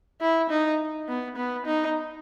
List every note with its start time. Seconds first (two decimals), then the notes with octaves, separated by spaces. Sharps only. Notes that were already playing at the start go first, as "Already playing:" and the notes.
0.21 E4
0.49 D#4
1.08 B3
1.36 B3
1.66 D#4